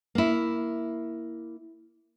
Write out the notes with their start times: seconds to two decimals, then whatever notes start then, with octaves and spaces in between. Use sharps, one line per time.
0.15 A#3 E4